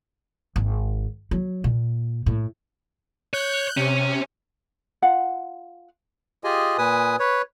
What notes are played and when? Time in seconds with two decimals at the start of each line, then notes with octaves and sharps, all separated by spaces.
0.56 G#1
1.31 F#3
1.64 A#2
2.26 A2
3.33 C#5 F#6 G6
3.77 C3 C#4 C#5
5.02 F4 F5 F#5
6.44 F4 G4 G#4 D#5 G#5
6.78 A#2 B4 G#5 D#6
7.19 B4 C#5